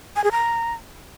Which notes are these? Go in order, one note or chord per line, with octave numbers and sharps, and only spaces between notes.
G#5
G#4
A#5